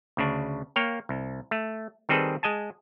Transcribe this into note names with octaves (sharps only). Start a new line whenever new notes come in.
D2 C#3 D4
A#3 C#5 F5 G5
C2
A3
D#3 G3 C4 G#4 A4 B4
G#3 D#5 G#5 A5